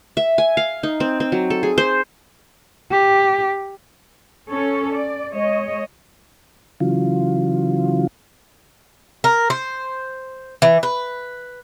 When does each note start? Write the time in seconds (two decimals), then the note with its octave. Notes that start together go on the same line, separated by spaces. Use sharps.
0.17 E5
0.38 G#5
0.57 F5
0.83 D#4
1.00 C4
1.20 C4
1.32 F#3
1.50 A4
1.63 G#4
1.78 C5
2.91 G4
4.49 C#4 A4 C#5
4.95 D5
5.32 G#3 C#5 D#5
6.80 C#3 E3 F#3 F4
9.24 A#4
9.50 C5
10.62 E3
10.83 B4